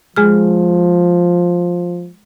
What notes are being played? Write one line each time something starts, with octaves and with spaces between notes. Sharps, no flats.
F3 G#3 G#4 F6